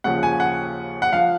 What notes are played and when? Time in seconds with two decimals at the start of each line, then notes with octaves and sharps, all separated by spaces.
0.04 D#2 C#3 F3 F#5
0.23 G#5
0.40 F#5
1.02 F#5
1.13 F3 F5